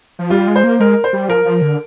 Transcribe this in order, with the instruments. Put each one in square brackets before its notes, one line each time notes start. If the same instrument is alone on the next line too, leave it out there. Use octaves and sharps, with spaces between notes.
[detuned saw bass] F3
[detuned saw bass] G3 [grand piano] F4
[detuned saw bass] G#3
[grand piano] C5
[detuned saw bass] A#3
[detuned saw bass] G#3 [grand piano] A#4
[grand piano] C5
[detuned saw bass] G3
[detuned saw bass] F3 [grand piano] A#4
[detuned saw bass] F3
D3